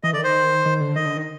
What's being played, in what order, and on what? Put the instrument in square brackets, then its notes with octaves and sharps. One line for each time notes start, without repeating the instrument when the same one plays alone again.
[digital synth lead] E3 [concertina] D#5
[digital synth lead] D3 [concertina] D5
[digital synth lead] D#3
[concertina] C5
[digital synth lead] D#3
D3
[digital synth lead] D#3 [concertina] D#5
[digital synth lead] D3
D#3